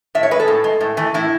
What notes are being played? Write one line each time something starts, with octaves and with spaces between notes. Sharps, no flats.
A2 E5
C#5
G#3 B4
A4
A2
G#3
A2
E3 A3
A2 E4